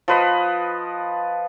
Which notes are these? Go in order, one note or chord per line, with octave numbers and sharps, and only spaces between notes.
F3 B4 D#5